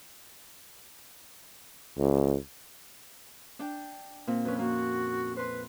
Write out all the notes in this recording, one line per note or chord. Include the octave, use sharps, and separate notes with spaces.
C#2
D4 G5
A#2 C4
F2 C#4 B4
A#3 F#4
B4 C5 C6